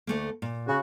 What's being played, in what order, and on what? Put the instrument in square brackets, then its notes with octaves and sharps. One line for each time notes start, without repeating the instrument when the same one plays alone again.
[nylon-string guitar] D2 A3 A#3
A#2
[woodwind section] C#3 F#4